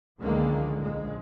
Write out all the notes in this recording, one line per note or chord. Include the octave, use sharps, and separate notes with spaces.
C#2 D3 D#3 F3 G#3 A#3
A#1 G#3